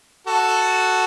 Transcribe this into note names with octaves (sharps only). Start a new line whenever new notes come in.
F#4 A4